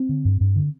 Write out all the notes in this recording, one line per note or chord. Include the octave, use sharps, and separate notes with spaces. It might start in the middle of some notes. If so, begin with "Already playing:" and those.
Already playing: C4
D3
G2
G2
D3